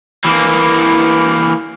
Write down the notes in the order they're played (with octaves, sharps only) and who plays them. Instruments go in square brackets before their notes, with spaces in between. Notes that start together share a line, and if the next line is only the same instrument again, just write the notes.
[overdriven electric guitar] E3 A#3